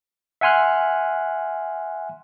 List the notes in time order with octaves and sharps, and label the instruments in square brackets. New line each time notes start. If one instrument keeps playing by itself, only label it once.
[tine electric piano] E5 F#5 G#5 C6 F6 F#6